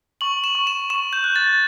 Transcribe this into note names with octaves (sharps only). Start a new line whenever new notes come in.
C#6 F#7
E7
C#6
E7
C#6 E7
G6
F#6
A6